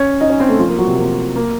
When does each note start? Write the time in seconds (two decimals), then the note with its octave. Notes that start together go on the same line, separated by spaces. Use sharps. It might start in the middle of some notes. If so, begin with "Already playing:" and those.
Already playing: C#4 C#5
0.21 D#4 D#5
0.30 C#4 C#5
0.40 C4 C5
0.49 A3 A4
0.59 F3 F4
0.68 A#3
0.78 F#3 F#4
0.87 C3 C4
0.97 A#3
1.36 A#3